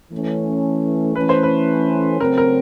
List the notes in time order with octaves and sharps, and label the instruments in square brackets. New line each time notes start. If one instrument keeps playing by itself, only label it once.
[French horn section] E3 A3 C#4
[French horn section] E3 A3 C#4 [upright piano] B4
[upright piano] C5
B4
[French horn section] C#3 F#3 A3 C4 [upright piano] A#4
[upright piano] A#4